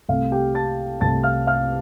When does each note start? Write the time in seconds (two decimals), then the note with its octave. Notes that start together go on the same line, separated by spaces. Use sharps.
0.08 C2 C3 A3 F5
0.31 G4 G5
0.54 A5 A6
1.01 C2 C3 A3 A5 A6
1.24 F5 F6
1.47 F5 F6